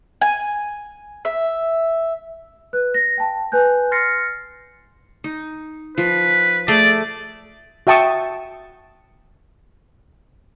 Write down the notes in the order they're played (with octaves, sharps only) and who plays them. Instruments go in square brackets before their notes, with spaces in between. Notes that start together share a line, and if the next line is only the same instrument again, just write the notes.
[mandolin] G#5
E5
[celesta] B4 F#6
A#6
G5 A5
B4 G#5 F#6 G6
C6 F6 A6 A#6 C7 C#7
[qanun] D#4
[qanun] F3 [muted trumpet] B4
[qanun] A3 G#4 A5 [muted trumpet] D5
[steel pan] F#4 E5 G5 A5 C#6 D#6